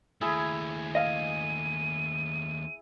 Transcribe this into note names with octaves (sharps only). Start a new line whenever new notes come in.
D#2 A3 E4 G#4 A#5
D#5 F5 D#7